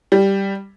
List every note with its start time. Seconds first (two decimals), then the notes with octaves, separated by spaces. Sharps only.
0.12 G3